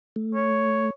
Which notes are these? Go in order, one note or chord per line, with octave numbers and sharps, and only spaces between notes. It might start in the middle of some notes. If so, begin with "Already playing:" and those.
A3
C#5